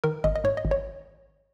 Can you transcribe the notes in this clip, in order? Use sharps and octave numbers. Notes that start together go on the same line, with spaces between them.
D#3 A#4
G#1 D#5
D#5
G#2 C#5
D#5
G#1
C#5